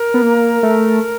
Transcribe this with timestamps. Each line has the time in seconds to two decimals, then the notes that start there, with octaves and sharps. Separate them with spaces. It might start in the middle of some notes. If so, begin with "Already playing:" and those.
Already playing: A#4
0.14 B3
0.22 A#3
0.63 A3